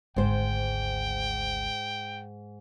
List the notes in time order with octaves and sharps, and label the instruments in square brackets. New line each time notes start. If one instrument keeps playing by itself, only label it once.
[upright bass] G#1 D2 [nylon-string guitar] G#2 C5 [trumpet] G5